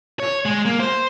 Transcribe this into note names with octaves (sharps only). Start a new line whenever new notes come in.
C#5
G#3
A#3
C5